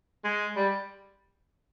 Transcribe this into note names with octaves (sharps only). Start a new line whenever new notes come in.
G#3
G3